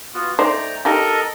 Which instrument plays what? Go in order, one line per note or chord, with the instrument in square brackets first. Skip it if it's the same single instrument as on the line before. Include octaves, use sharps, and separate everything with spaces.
[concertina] B3 F4 F#4
[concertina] A3 G5 A#5 [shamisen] D#4 C5 D5
[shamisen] D#4 G4 [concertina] A4 A#4 D#5